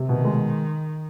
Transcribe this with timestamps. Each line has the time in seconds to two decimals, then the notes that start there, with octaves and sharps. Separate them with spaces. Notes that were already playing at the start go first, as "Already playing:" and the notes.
Already playing: C3
0.08 B2 D#3
0.25 G#3